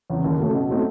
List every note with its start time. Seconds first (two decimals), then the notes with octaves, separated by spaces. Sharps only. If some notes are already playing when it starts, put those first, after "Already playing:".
0.10 E2 C#3
0.24 D#2
0.39 C#3 F#3 A3
0.54 B2
0.69 F#3 A3 C4 D#4